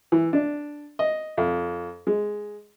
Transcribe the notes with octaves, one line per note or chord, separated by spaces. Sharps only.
E3
D4
D#5
F2
G#3